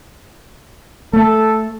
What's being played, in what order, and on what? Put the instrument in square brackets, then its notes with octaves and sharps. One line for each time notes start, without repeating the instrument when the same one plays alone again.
[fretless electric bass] A3 [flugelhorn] A4